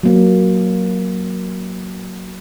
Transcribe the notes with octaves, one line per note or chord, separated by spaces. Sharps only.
F#3 A#3